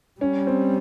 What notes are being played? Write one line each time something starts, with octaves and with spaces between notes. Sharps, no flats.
G3 C#4
C4